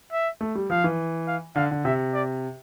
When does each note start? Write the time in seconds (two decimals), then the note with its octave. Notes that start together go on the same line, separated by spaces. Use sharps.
0.12 E5
0.41 A3
0.55 G3
0.70 F3 F5
0.84 E3
1.28 F5
1.55 D3 F5
1.71 D3
1.85 C3 E5
2.14 D5